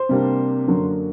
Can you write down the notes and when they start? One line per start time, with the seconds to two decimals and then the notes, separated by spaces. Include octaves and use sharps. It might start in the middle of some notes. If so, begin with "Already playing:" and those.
Already playing: C5
0.09 C3 G3 A#3 D4
0.66 F#2 D3 F#3 A#3